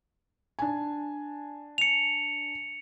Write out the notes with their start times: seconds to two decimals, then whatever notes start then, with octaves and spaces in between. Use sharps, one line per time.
0.59 D4 G#5
1.78 C#7 F7